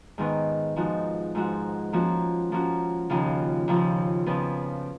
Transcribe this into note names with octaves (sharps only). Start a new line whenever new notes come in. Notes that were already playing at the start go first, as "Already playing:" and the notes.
G#2 D#3 G#3 B3
G#2 F3 G#3 D#4 F#4
G#2 F3 G#3 D#4 F#4
F3 A#3 C#4 F#4
F3 A#3 C#4 F#4
D#2 C#3 F3
D#2 C#3 F3
F2 C#3 F3 B3